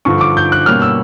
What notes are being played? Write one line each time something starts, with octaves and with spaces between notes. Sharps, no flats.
G2 D3 F3 C#6
D6
G6
F#6
B2 G3 A#3 C#4 F6
E6